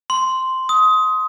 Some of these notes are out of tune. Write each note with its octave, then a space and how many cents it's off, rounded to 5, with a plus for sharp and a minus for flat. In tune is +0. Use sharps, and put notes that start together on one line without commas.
C6 -5
D#6 +20